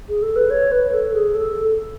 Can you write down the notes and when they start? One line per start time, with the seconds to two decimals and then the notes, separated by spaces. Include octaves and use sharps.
0.09 G#4
0.22 A4
0.36 B4
0.50 C#5
0.72 B4
0.92 A4
1.13 G#4
1.35 A4